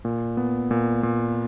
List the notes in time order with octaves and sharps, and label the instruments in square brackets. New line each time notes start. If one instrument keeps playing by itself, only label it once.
[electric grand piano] A#2
B3
A#2
A#2